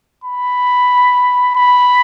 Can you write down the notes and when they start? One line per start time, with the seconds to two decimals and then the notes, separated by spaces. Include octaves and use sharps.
0.24 B5
1.56 B5